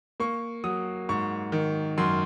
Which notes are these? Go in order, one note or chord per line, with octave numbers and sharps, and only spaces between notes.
A#3 C#6
F#3 D#6
G#2 C#6
D#3
F#2 C6